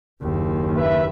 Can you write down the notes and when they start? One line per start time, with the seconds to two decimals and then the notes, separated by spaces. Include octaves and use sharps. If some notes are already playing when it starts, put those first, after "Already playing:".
0.22 F#1 D#2
0.77 C#3 B4 E5